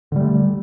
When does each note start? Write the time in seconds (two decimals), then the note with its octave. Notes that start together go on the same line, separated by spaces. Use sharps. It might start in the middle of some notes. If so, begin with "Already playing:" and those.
0.12 D3
0.16 G3
0.20 A3